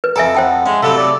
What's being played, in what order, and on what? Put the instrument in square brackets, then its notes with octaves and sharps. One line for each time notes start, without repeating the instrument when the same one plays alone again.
[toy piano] B4
[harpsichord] F2 A4 [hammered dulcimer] D#5 [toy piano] E5 G#5 A#5
[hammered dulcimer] E4 D#5 F#5 [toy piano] C5 G5 A5
[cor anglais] G#3 [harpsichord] C#4 [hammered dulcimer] E5
[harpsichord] C3 F#3 A3 [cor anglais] A4 [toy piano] F5 B5
[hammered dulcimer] E4 [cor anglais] D5